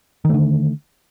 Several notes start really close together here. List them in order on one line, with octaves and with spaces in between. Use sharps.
D#3 A3 D3